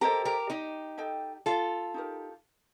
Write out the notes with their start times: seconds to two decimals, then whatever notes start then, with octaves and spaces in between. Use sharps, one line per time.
0.01 G4 A4 A#4 C5 D#5 A#5
0.25 G4 A#4
0.50 D#4 G4
0.98 A4 D#5 G5
1.46 F4 A4
1.94 D#4 G4 A#4